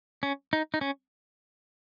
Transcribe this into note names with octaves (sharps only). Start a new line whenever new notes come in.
C#4
D#4
D#4
C#4